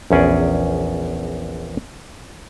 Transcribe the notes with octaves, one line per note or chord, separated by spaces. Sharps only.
A#1 E2 C#4 G#4 D5